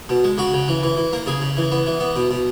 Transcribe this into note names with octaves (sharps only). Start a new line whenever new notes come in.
B2
G#3
C#3 F#4
C#3
E3
E3
E3
A#3
C#3 G#4
C#3
E3
B3
E3
B3
B2
B2